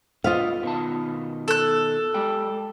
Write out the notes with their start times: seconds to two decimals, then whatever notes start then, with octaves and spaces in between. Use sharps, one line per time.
0.24 D3 F4 B4 D#5 F5
0.63 B2 D#3 A5
1.48 A4 F#6
2.14 G#3 G4 G5